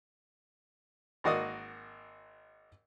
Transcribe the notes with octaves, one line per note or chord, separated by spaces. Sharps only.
G#1 A#3 F#4 D5 D#5 D#6